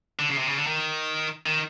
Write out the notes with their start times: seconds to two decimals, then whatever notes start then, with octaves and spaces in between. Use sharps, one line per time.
0.19 D3
0.30 C#3
0.38 C3
0.48 C#3
0.58 D3
0.67 D#3
1.46 D#3